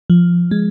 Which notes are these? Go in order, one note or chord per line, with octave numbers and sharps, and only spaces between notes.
F3
G#3